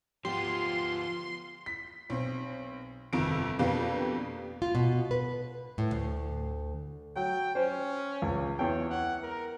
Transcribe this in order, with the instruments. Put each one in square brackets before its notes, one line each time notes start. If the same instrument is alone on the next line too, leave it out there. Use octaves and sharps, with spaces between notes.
[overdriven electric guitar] F3 B3 [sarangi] F4 [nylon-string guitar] G4 [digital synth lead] C6
[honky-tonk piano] B6
B1 C4
G1 F2 C3 D#3 D7
F2 B2 A#3 D4 G4 B4
[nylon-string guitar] F4
B2
B4
A2
D2
[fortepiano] F#3 [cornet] G5
[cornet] C#4 [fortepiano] C5
[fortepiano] C#2
[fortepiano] E2 G5 [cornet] C#5
[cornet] F#5
A#4